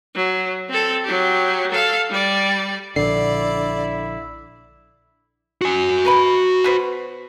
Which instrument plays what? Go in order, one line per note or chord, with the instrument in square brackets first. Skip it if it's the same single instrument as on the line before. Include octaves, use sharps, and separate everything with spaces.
[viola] F#3
C4 A4
F#3 G4
A4 F5
G3 D5
[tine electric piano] A#1 C7 [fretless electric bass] D3 [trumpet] E4 [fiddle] D5
[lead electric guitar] F#4 G#5
[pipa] A#4 B4 B5
B2 B4 C5